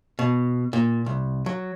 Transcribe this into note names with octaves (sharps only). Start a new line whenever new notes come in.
B2
A#2
C2
F#3